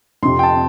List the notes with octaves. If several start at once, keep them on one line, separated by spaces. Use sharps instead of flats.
F2 C3 F3 C6
G5
A5